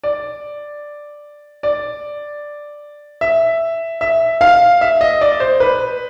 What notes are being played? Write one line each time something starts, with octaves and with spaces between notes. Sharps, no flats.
D5
D5
E5
E5
F5
E5
D#5
D5
C5
B4